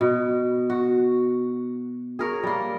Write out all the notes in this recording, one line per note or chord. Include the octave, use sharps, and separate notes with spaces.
B2
F#4
G#4 A#4 C#5
G3 A#3